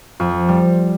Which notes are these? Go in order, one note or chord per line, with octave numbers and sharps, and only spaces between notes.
F2
G3